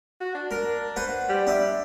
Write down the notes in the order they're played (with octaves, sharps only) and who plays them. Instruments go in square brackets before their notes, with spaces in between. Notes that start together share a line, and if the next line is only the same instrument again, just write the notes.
[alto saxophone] F#4
D4
[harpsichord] A#4
B4 C5 F#5
[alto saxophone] G3
[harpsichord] D4 E5